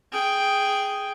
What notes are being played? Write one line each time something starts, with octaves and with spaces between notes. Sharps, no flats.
G#4 G5